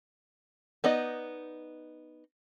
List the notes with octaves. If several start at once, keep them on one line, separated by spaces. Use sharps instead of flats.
B3 D#4 D5 D#5